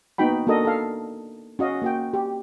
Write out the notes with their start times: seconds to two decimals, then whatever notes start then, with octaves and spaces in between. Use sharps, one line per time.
0.18 A#3 B3 D#4 F#4 G5 B5
0.47 A#3 D4 F#4 A4 A#4 D#5
0.65 A4 F5
1.59 C#4 F#4 D#5 F5
1.82 A#3 F#4 G5
2.14 G4